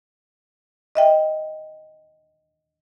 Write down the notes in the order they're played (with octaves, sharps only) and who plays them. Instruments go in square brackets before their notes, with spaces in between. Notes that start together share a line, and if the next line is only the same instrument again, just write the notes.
[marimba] D#5 E5 G5